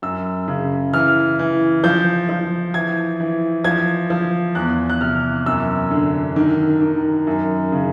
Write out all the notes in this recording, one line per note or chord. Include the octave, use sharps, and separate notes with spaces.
F#2 E6
C#3
E3 F6
E3
F3 G6
F3
E3 G#6
E3
F3 G#6
F3
E2 F#6
F#6
C3 F6
F#2 E6
D3
D#3
D#3
F#2
C#3